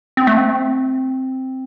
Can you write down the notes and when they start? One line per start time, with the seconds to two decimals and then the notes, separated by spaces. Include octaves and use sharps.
0.17 C4
0.27 A3
0.38 C4